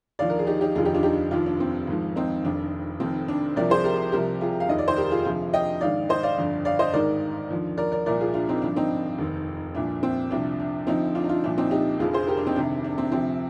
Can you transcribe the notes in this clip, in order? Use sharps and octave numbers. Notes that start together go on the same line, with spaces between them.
D#2 D3 F3 D5 F5
A#4
G#4
D#4 G4
D#4 G4
F1 D#2 D3 F3 F4 G#4
D#4 G4
D4 F4
D#4 G4
F1 D#2 D3 F3 D4 F4
D4
C4
G#1 G#2 F3
C4 D#4
F1 F2 D#3 D4
F1 F2 D#3 C4
D4
C2 C3 F3 A#4 D5
G#4 C5
G4 A#4
C2 C3 F3 G4 A#4
F4 G#4
F5
F1 D#2 D#3 D#5
D5
C5
G4 A#4
F4 G#4
D2 C3 F3 F4 G#4
D#5 G5
A#1 G#2 D#3 D5 F5
C5 D#5
D5 F5
G1 F2 D3
D5 F5
C5 D#5
G#1 G#2 D#3 A#4 D5
D#2 D3 F3
A#4 D5
A#4 D5
C2 A#2 F3 A#4 D5
F4 G#4
D4 F4
C4 D#4
G#1 G2 D3 F3 D4
C4 D#4
F1 D#2 D#3
C2 A#2 F3 D4
C4
C2 C3 F3 D4
D4
D2 D3 F3 C4 D#4
D4 F4
D#4
D4 F4
C2 A#2 F3 D4
C4 D#4
D#4 G4
F1 F2 D3 F3 F4 G#4
G#4 C5
G4 A#4
D4
C4 D#4
D2 C3 D#3 D4
D4
C4
D2 C3 F3 C4